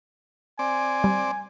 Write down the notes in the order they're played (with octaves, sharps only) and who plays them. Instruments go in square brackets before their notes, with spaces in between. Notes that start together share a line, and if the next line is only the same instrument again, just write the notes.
[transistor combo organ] C4 D5 [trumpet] G#5
[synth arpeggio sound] G3